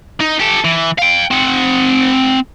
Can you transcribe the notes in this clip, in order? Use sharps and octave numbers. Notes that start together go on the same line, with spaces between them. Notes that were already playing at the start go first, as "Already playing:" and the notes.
D#4
G4 A4
E3
F5 G5
C4 F#5